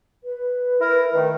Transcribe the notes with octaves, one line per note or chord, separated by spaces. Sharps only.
B4
E4 A#4
D#3 A3